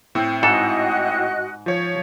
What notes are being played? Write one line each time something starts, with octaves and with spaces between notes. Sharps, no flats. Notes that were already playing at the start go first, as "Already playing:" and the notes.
A2 C4
G#2 F#4 A4 D#5 F#6
F3 C#5